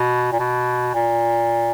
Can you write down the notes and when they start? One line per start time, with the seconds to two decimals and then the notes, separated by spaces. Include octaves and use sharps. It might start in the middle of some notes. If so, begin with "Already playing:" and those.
Already playing: B2
0.32 A#2
0.39 B2
0.94 A#2